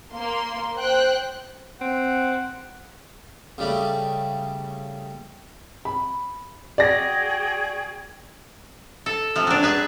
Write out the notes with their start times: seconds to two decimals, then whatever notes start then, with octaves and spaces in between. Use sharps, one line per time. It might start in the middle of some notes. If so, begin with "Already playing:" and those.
0.13 A#3 C6
0.76 C5 G5 F#6
1.81 C4 F#5
3.58 C#3 G3 A3
5.85 B5
6.78 F#4 G#4 D5 G5 A#6
9.06 A4
9.36 C3 F3
9.47 F#3 D4
9.63 G#4 B4 G#5